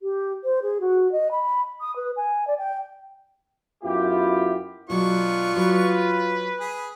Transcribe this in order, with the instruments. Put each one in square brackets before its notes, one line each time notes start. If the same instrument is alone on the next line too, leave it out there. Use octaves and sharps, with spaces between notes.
[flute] G4
C5
G#4
F#4
D#5
B5
D#6
B4
G#5
D5
G5
[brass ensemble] F#2 B3 E4 F4 G4
[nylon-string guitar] B2 F#3 G#3 [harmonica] B3 D4 C#6 [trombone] F4
[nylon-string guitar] F#3 [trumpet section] B4
[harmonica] G#4